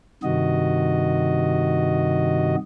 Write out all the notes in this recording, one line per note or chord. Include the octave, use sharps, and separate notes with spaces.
G2 C3 D#3 F#4 D#5